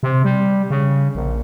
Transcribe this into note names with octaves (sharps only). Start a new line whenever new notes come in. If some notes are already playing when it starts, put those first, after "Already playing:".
C3
G3
C#3
A#1